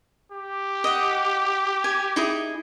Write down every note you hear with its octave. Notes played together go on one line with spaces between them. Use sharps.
G4
D#5 F#5
G#5
D#4 E4 G#4